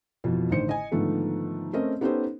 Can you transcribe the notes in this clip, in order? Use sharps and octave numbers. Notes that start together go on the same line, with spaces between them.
F2 B2 E3 F3
A1 D3 D#3 C5 C#7
D#5 G#5
G#2 D3 D#3 F3 A3 B3
A3 C4 C#4 A#4 D#5
B3 C#4 D#4 G4 A4 C5